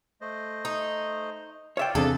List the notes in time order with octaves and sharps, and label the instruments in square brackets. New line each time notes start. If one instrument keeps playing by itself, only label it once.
[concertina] A3 C5 D#5
[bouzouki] D#4
[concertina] F4 D5 F5 [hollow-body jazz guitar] C#5 E5 G5
[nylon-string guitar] E2 C3 [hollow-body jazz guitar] C4 D4 G#4 [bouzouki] A4